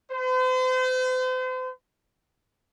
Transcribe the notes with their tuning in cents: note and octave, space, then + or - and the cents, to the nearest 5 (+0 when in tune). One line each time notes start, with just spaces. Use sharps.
C5 -40